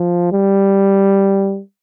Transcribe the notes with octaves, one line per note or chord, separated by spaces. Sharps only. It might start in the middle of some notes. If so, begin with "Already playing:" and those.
Already playing: F3
G3